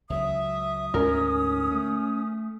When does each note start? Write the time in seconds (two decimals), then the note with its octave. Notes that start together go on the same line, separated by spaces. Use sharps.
0.10 C#2 F#3 E5 D#6
0.94 D2 G#2 D3 C#4 A#4
1.71 A3